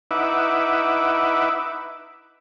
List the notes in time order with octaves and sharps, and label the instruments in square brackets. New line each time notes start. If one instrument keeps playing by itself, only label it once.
[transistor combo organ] D#4 E4 B4 E5 F#5 D6